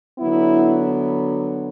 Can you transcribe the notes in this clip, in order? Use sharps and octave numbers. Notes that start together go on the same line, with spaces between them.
D3 F#3 B3 E4